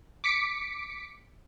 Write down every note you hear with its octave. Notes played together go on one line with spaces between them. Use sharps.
D6 B6 C#7 D7